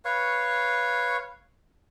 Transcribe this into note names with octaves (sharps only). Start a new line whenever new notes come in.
B4 C#5 F5 C#6